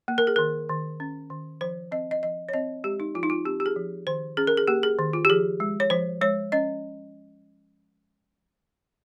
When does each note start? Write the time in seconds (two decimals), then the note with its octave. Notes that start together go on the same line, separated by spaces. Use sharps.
0.08 A#3
0.18 A#4
0.27 G#4
0.36 D#3 A#4
0.69 D#3
1.00 C#4
1.30 D#3
1.61 F3 C5
1.91 C4 D#5
2.11 D#5
2.22 F3 D#5
2.49 C#5
2.53 C4 D#5
2.84 G#3 G4
3.00 D#4
3.15 F3 F4
3.23 D#4
3.30 F4
3.45 C4 G4
3.60 G4
3.66 G#4
3.76 F3
4.07 D#3 C5
4.37 C#4 G#4
4.47 A#4
4.57 G#4
4.68 A#3 G4
4.83 G#4
4.99 D#3
5.13 F4
5.25 G4
5.30 F3 G#4
5.60 G#3
5.80 C#5
5.90 F3 C5
6.21 G#3 C#5
6.52 C#4 D#5